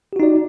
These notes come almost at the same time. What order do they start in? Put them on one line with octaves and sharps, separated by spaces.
G4 F#4 D#4 D5